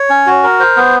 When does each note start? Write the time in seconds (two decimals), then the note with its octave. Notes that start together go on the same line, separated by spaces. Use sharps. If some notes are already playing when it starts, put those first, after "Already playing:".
Already playing: C#5
0.10 C#4
0.26 F#4
0.43 A#4
0.60 C5
0.76 B3